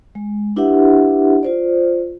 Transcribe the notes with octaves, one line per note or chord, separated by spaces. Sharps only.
G#3
D4 E4 G4 B4 E5 F#5
F4 C5 D5